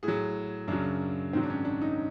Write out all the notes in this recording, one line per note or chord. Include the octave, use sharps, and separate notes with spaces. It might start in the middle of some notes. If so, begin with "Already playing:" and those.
A2 G#4
F#3
F#2 C#3 F#3 D4
G#2 D#3 F#3 C4
D4
C#4
D4
D#4